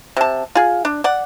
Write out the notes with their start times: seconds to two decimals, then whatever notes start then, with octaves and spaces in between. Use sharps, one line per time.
0.17 C3 A5
0.55 F4 G#4
0.85 D4
1.04 D5 F#5